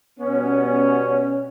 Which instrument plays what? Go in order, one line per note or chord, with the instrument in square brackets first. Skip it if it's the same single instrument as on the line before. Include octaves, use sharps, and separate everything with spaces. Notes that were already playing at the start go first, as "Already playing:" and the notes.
[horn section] B2 G3 B3 C#4